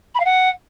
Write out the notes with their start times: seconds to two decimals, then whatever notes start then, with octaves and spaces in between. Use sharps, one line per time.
0.15 B5
0.20 F5
0.25 F#5